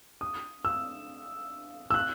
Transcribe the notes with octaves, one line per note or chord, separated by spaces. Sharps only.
D#6
E6
E6
F#6